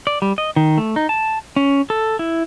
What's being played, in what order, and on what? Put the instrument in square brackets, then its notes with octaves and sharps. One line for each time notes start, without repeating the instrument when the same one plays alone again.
[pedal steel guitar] D5
G3
D#5
D#3
A3
D#4
A5
C#4
A4
E4